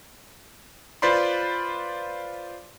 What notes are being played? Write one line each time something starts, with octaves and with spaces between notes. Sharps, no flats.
F4 B4 C5 D5 B5 C6